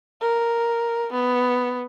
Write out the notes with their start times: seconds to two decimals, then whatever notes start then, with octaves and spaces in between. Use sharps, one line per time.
0.21 A#4
1.12 B3